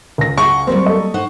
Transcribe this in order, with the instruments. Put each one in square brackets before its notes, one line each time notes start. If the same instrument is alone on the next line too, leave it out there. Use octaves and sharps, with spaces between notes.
[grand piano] C#2 A#6
[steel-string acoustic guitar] G#4 F#5 G5 [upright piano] C#6
[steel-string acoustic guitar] F#3 G3 A#3 [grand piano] C4
[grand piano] A4 D#5
[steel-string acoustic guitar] D#4 C5 F#5